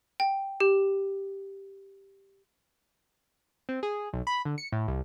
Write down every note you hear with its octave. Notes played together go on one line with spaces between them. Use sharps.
G5
G4
C4
G#4
B1
B5
D3
C#7
A2
C2